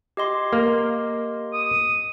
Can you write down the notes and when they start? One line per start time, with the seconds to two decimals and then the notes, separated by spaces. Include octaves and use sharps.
0.17 G4 D#5 C6
0.53 A#3
1.53 D#6